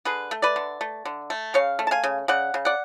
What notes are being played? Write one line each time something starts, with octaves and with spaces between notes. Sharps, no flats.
D3 G#4 B4
A3
B4 D5
D3
A3
D3
A3
C#3 C#5 F5
A3
A5
F5 G#5
C#3
C#3 D5 F#5
C#3
D5 F#5